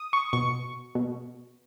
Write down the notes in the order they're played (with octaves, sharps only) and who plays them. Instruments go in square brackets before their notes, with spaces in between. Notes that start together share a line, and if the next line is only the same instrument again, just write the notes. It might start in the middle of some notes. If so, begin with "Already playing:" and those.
Already playing: [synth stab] D#6
C#6
B2 C#6
B2